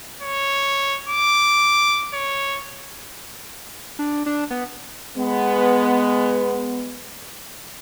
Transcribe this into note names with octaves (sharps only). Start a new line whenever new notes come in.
C#5
D6
C#5
D4
D4
B3
G#3 B3